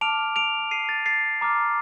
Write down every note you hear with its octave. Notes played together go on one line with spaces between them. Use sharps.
A5 D6 F6 D7 F7
D7 F7
C7 D#7
A6
A6 C7
A#5 D6 F6